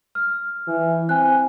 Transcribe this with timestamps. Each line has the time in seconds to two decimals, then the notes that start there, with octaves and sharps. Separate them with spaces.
0.15 F6
0.67 E3
1.09 C4 G#5 F#6